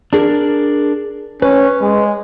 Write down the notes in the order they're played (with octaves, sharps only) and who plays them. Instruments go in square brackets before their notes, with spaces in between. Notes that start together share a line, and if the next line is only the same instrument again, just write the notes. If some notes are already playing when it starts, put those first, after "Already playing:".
[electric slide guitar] D4 G#4 A#4
[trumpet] C#4 [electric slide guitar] B4
[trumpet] G#3